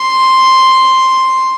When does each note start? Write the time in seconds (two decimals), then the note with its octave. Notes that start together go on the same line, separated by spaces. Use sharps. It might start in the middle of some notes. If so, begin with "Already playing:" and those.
Already playing: C6